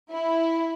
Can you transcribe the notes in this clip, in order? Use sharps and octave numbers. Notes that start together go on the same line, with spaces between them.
E4